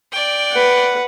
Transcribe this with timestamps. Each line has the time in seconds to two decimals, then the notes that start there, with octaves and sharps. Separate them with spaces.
0.12 D5 G5
0.52 B4 F#5